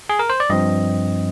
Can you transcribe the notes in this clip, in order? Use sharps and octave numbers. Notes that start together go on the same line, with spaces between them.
G#4
A#4
C5
D5
G2 F3 C4 D#5